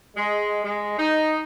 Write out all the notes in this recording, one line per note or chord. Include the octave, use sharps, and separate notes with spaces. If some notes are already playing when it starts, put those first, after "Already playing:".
G#3
G#3
D#4